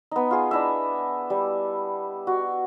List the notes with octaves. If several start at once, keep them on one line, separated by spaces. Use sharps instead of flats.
B3 D#4
F4 G#4
D4 E4 D#5 E5
G3
F#4